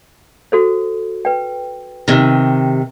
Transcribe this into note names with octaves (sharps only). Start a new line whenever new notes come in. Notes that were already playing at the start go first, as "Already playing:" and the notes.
F#4 A4 C5
B4 G5
C3 D#3